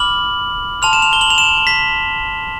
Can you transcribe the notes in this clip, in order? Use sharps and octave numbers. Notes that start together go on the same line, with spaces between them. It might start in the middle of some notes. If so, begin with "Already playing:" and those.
Already playing: B5 D6 F6 F#7
A5 C6 F6 F7
E7
F7
G7
F#7
F7
E7
B6